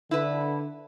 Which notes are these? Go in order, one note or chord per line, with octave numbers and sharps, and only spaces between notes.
D3 E4 B4